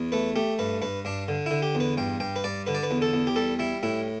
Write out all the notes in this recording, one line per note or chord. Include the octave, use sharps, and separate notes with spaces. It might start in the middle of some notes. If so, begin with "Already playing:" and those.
Already playing: E2
A3 B4
A3 G4
G2 B4
G2 B4
G2 D4
D3
D3 E4
G4
E2
B4
G2 G5
G2 G5
B4
G2 D5
D3 B4
D5
B4
E2
A4
E2
G4
G3 A4
G3 E4
A2 E4